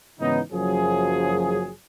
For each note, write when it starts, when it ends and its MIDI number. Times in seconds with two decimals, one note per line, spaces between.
0.20 0.40 44
0.20 0.40 49
0.20 0.40 52
0.20 0.40 59
0.20 0.40 61
0.20 0.40 63
0.52 1.71 30
0.52 1.71 42
0.52 1.71 53
0.52 1.71 54
0.52 1.71 68